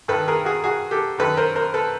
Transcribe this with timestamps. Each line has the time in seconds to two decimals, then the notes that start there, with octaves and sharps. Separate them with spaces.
0.08 G2 D#3 A4 B4
0.28 G#4 A#4
0.45 F#4 G#4
0.64 F#4 G#4
0.91 G4 A4
1.18 F#2 D#3 A4 B4
1.37 A#4 C5
1.55 A#4 C5
1.74 A4 B4